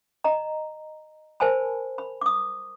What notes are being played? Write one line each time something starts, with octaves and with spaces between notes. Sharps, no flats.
D#5 A#5
A#4 C5 G#5 A5 B5
B5
D6 D#6